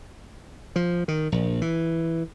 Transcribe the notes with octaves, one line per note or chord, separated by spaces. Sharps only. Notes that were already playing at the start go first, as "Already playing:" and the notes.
F3
D#3
A#1
E3